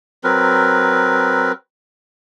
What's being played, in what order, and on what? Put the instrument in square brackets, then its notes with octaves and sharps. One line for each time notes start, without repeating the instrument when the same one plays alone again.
[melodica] F#3 C4 A#4 B4